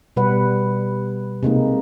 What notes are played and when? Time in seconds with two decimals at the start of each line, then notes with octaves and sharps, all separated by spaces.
0.16 B2 G3 B4 F#5
1.43 C3 G#3 A#3 D#4